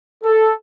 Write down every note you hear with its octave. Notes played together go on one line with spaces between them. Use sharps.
A4